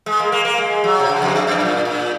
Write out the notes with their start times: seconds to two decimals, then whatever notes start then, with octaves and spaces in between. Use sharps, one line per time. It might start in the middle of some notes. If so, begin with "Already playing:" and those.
0.06 G#3
0.20 A#3
0.32 A#3
0.45 A#3
0.58 G#3
0.84 F#3
1.00 C3
1.09 C#3
1.22 F2
1.35 F#2
1.47 F#2
1.60 A#2
1.85 A#2